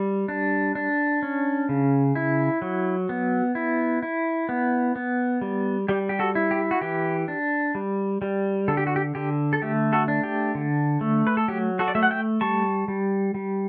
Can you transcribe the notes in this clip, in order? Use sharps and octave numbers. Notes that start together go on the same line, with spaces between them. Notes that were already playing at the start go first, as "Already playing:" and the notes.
Already playing: G3
D4
D4
C#4
C#3
E4
F#3
B3
E4
E4
B3
B3
G3
G3 G4
G4
F#4 A4
E4
G4
F#4
E3 G4
D4
G3
G3
D3 A4
G4
F#4
G4
D3 G4
A4
A3 G4
F#4 A4
D4
G4
D3
A3
B4
A4
F#3 G4
F#4 A4
D5
A3 E5
F#5
E5 G5
G3 A5 C#6
G3
G3